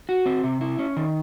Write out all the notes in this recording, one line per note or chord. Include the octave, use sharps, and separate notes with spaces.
F#4
C4
C3
E4
C#4
D#3